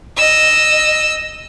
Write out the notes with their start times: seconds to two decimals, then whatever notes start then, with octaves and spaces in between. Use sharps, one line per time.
0.18 D#5 E6